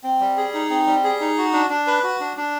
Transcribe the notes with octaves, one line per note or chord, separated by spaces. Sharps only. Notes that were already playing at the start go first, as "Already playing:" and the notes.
C4
G3
G#4
D#4
C4
G3
G#4
D#4
F#4
D4
D4
B4
F#4
D4
D4